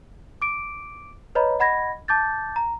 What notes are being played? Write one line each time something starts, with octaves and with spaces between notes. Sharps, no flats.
D6 D7
B4 C#5 D#5 A#5 B5
D#5 F#5 B5 G#6 A#6
A5 D6 G6 A6
A#5